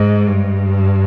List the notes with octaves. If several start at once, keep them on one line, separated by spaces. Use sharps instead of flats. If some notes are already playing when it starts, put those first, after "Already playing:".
Already playing: G#2
G2